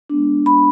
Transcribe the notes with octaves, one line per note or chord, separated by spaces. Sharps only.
G#3 B3 D4
B5